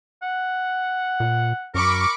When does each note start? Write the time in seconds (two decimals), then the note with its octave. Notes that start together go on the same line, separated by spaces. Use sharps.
0.23 F#5
1.20 A#2
1.75 F#2 A#4 B5 C#6 D6